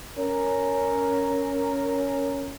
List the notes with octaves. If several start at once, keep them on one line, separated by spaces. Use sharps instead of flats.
C#4 A#4